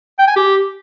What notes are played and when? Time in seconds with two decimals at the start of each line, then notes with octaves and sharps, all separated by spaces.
0.19 G5
0.28 G#5
0.36 G4